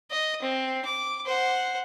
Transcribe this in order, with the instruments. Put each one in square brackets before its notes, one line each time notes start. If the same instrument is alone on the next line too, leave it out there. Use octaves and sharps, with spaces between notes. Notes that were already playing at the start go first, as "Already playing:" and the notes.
[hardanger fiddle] D#5
C4
D6
C5 F#5